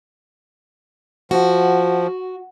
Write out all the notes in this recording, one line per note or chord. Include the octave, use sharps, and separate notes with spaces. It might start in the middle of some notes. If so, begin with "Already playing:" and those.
F3 F#4